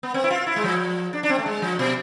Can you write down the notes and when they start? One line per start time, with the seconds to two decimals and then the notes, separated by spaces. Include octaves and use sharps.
0.03 B3
0.14 C4
0.24 E4
0.30 F4
0.47 E4
0.56 G#3
0.64 F3
1.13 D4
1.23 D4
1.29 C4
1.38 A3
1.46 G#3
1.62 F3
1.79 B2